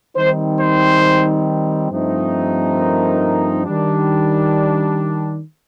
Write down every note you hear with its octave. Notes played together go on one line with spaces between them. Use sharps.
D#3 G3 C4 D#4 C5
C5
G2 F3 A3 C4 D#4
A#4
D#3 G3 D4